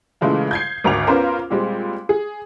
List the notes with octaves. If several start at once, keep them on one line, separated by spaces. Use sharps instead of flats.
A#2 C#3 E3 G#3 A3 E4
G6 G#6 C7
G#1 D2 A#4 D6 F7
B3 C#4 F4 A#4 C5
A#2 G3 G#3 C4
G#4